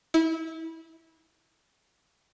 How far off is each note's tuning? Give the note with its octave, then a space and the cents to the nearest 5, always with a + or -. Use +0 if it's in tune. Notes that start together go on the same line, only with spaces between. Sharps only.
E4 -25